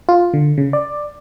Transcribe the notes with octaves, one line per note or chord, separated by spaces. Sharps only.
F4
D3
C#3
D5